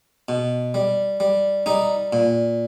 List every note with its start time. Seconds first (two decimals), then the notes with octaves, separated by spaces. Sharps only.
0.29 B2
0.74 G3
1.20 G3
1.66 G3 D#4
2.13 A#2